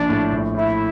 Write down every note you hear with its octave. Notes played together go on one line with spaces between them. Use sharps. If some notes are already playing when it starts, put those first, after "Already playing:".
Already playing: A#1 D4
A2
A#1
A2 E4